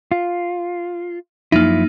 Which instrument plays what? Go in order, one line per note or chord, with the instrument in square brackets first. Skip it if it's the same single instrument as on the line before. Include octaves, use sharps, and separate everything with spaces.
[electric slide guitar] F4
[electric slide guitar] F#2 F3 E4 [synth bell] A#3 D#4